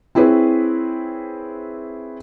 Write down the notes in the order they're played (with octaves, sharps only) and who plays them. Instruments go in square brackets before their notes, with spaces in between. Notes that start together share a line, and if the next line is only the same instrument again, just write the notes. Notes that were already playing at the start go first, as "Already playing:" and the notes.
[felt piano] C4 E4 G#4 B4 C#5